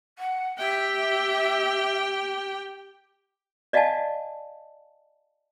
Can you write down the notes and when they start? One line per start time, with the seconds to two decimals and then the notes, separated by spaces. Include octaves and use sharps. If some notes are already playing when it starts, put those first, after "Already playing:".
0.18 F#5
0.58 G4 E5 G5
3.73 D5 D#5 F5 F#5 G#5 A5